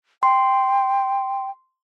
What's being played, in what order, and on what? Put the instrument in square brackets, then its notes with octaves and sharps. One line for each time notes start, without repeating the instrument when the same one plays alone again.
[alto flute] G5 [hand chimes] C6